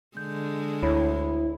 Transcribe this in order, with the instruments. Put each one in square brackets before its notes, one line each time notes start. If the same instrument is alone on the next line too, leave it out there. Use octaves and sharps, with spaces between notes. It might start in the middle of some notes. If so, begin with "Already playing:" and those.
[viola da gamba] D3 G#3 [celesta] G6
[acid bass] D2 [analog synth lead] E4 [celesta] C#5